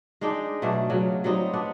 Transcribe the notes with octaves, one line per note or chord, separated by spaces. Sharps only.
G#3 D4 D#4 G5
B2 F#3 A3 D4
C#3 F#3
F#3 G3 C4 D#4
B3 D4 F#5